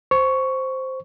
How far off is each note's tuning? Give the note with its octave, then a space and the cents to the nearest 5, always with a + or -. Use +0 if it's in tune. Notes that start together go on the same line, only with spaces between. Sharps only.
C5 +0 C#6 +10